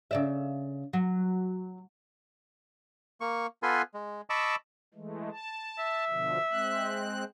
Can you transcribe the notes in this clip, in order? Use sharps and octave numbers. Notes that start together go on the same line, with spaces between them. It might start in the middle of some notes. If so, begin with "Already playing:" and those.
C#3 D5 E5
F#3
A#3 C#6
B3 F4 A4 B4 G#5 C6
G#3
D#5 A5 B5 C#6 D6 E6
E3 G#3 A3
A5
E5
B2 D3 F3
G#3 C4 F#6